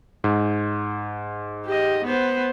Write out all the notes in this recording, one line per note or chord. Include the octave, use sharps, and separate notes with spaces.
G#2
G4 D#5
B3 C5